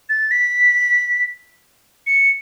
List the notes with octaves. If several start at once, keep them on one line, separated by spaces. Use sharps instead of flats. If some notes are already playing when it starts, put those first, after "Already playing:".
A6
B6
C#7